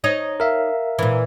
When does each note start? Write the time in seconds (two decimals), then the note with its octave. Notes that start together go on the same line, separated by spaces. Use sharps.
0.04 D#4 C#5 D#5
0.40 A#4 E5 F5
0.99 A#2 E3